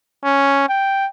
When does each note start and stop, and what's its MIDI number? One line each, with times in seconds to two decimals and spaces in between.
0.25 0.65 61
0.69 1.07 79